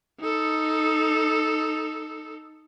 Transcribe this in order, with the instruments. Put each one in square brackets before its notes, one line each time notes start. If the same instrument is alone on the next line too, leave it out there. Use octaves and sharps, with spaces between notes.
[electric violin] D#4 A4